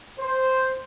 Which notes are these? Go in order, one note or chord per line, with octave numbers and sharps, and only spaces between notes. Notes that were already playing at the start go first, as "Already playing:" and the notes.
C5